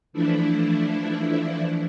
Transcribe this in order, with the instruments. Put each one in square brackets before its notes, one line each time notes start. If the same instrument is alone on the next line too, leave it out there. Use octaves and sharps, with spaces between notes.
[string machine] E3 F3 A3 D4 E4